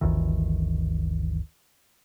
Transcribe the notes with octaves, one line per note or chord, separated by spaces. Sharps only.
G1 D2 D#3 E3